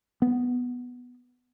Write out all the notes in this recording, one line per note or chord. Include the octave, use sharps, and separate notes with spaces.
B3